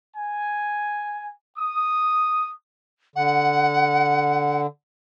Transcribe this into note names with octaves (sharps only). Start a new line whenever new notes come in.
G#5
D#6
D3 F#5